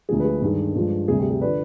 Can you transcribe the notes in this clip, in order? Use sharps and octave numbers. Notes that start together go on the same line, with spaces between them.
D2 D3 F3 G#3 G#4
B4
G#4
G2 D#3 G#3
G2 F3 G#3
D2 C3 G3 G#4
G4
G#4
D3 F3 B4 D5